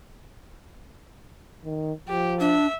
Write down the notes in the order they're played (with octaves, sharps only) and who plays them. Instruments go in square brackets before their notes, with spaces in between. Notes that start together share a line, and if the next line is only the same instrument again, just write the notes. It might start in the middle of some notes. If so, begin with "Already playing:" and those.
[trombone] D#3
[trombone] F3 [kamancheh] G4
[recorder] D4 [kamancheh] E5